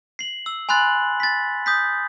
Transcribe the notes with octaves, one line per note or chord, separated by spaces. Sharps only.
C7 F#7
E6
G#5 B5 C6 F#6 A6 F#7
A6 B6
D#6 G6 B6